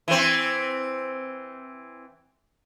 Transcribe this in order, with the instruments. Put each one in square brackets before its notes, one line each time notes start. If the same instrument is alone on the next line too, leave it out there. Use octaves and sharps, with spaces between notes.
[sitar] E3 C4